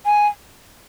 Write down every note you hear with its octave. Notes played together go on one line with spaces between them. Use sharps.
G#5